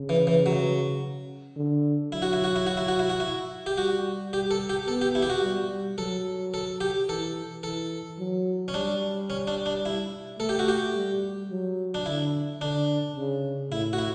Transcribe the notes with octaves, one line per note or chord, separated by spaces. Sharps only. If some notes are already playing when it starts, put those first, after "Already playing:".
Already playing: C#3
E3
E3
F#3
D3
F#3 E4
F#4
E4
F#4
E4
F#4
E4
F#4
E4
F#4
E4
G4
G3 F#4
G4
A4
G4
B3 A4
G4
E4
G4
F#4
G3
F#3 A4
A4
G4
E3 A4
E3 A4
F#3
C#4
G3 D4
C#4
D4
D4
E4
A3 A4
G4
F#4
G4
G3
F#3
D4
D3 E4
D3 D4
C#3
A2 E4
F#4
E4